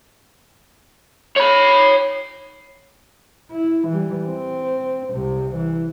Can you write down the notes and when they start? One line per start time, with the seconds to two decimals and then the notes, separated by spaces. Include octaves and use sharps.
1.37 C#5 B5
3.52 E4
3.88 E3 G3
4.28 C4
5.13 C2 C3
5.55 E3